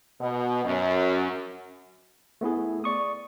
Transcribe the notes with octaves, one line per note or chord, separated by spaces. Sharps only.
B2
F#2
A3 B3 E4 G#4
D5 C#6 D#6